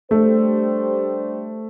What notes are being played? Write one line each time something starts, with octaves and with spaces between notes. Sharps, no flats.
G3 A3 D4 G4 C5